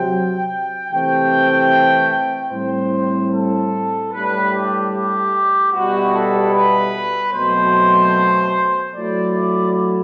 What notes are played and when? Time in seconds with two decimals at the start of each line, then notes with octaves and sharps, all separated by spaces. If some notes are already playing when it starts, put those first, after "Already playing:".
Already playing: C3 F#3 C4 G5
0.90 C3 E3 A3 C4 G5
2.51 A2 G3 C4 E4 C5
3.31 A4
4.11 A2 G3 D4 B4
4.52 G4
4.93 G4
5.72 B2 G3 B3 E4 F#4
6.12 A4
6.53 B4
7.33 B2 F#3 A3 C4 C5
8.93 F#3 A3 E4 D5
9.34 D5